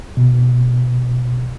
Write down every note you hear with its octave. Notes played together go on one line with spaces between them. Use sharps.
B2